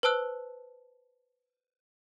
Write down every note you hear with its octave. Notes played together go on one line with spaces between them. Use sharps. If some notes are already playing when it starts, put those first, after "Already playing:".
B4 C5 A5 E6 F#6